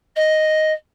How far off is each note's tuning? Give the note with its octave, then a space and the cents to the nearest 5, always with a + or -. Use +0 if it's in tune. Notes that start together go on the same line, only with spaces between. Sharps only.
D#5 +0